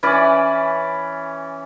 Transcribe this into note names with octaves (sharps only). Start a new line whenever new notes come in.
E3 C#4 B4 D5